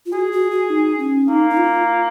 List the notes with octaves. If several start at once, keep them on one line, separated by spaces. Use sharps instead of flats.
F4
F#4 G#4
F#4
F#4
D#4
C#4
A#3 D#4
D#4
F4